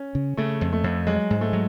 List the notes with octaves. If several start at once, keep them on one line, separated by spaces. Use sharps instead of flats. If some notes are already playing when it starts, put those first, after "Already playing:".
Already playing: C#4
C#3
C#3 A3
F2
A3
F2
F#3 G#3
G#2
A3
F#3